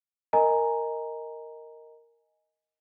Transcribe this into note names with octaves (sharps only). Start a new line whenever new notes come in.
A#4 D#5 G#5 A#5